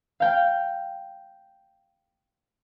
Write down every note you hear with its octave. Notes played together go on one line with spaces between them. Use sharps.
F5 G5